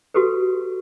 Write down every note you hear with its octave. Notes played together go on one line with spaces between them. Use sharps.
F#4 G4 A4 B4